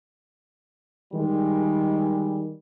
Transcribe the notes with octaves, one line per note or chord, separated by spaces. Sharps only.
D#3 G3 G#3